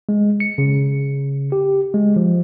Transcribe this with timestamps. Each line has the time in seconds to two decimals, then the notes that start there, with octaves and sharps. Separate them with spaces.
0.09 G#3
0.40 C#7
0.58 C#3
1.52 G4
1.94 G#3
2.16 F3